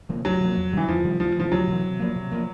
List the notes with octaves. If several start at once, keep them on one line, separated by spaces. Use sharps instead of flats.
C3 F3 A#3
D2 F#3
C3 F3 A#3
F2
C3 D#3 E3 G3
F2 F3
C3 D#3 G3
D2 F3
C3 E3 F3
D2 F#3
C3 E3
C3
F3 A#3
C3
F3 A#3